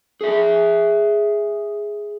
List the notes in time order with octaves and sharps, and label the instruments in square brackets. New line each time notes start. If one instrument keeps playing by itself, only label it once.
[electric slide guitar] G#4 E5